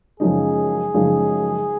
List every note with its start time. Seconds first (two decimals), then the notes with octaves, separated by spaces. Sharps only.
0.20 F#2 C#3 F3 G#3 D#4 G#4
0.94 F#2 C#3 F3 G#3 D#4